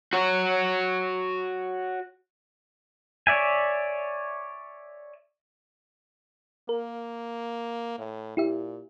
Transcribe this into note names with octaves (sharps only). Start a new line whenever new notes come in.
F#4 C#5
C#5 D5 E5 G#5
A#3 A#4
A2
A#2 E4 G4 E5